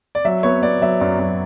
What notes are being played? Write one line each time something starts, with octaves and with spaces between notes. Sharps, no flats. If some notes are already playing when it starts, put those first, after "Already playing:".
D5
F#3 E5
B3 C#5
B3 D5
F#3 E5
F#2 D5
F#2